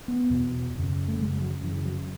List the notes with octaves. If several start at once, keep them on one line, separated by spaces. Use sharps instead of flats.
B3
E2 B2
F#2 C#3
A3
F#2 C#3 G#3
F#3
F#2 C#3 E3
F#3